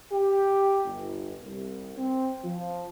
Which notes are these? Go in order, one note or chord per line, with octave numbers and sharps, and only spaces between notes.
G4
G1
C2
C4
F3